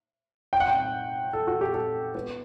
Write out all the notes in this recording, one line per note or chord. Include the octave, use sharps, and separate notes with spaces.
G5
F#5
G5
A4
F#4
G4
A4
B3